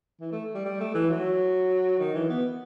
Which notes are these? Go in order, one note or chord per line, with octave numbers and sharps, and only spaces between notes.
E3
A3
G3
G3
A3
E3
F#3
D#3
E3
B3